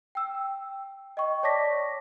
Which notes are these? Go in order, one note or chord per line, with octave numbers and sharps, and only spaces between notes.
G5 E6
D#5 G5 C#6
C#5 D5 A5 D6 A#6 B6